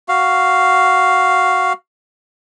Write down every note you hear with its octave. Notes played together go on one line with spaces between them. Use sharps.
F#4 F5